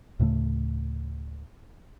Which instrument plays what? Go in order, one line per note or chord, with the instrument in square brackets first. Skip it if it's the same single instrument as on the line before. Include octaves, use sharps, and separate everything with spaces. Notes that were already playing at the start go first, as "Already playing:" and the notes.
[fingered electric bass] D2 A2 C#3 A3